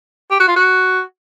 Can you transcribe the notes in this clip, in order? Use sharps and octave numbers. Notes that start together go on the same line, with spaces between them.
G4
F#4
F4
F#4